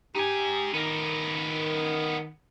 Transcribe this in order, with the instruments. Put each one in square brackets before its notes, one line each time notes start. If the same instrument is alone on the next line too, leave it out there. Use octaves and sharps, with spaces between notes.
[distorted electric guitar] D#4 G#5 [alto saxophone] G4
[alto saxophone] D#3 [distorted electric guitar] B3 A#4